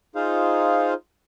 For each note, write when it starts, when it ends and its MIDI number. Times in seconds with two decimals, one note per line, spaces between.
0.16 0.94 63
0.16 0.94 65
0.16 0.94 68
0.16 0.94 72
0.16 0.94 77